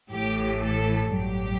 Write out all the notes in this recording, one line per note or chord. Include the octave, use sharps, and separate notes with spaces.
A1 A2 E3 G4
A4
A1 G2 F#3 G4